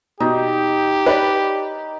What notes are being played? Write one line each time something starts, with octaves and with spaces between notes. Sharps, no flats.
B2 D#4 G4
B4 C#5 D5